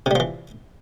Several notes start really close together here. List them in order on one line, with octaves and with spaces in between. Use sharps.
C3 G3 F3 E3